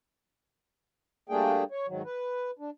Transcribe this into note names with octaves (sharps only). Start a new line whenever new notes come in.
G3 A3 A#3 D4 G#4 G5
C#5
G#2 D#3 F#3
B4
D4